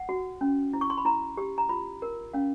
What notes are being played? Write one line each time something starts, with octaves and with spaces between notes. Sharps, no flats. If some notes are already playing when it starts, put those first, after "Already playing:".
Already playing: F#5
F#4
C#4
E4
C#6
C6
B5
E4 A#5
G4
A#5
F4 B5
A#4
C#4 F5